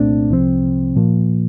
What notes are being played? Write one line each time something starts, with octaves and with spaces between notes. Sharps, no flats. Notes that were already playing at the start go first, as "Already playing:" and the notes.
Already playing: C2 A#2 A3 C4 D4
C2 C3 F3 C4
A#2 F3 A#3